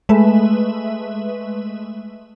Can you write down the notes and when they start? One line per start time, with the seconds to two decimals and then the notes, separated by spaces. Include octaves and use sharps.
0.09 G#3 A3 B4 E5